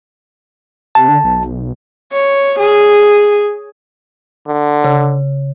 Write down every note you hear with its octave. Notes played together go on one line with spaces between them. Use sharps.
C3 A5
D3
B1
C#5
G#4
D3
C#3